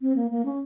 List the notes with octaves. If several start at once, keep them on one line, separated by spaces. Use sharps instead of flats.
C4
A#3
A#3
C#4